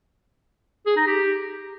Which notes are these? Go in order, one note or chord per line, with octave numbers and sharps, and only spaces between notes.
G#4
D#4
G4